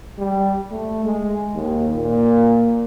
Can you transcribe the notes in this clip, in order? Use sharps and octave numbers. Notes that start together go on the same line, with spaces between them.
G3
A3
G#3
D#2
A#2